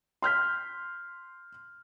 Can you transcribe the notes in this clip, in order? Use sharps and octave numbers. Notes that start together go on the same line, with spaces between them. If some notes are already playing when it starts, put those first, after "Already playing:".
C6 F6 G6 B6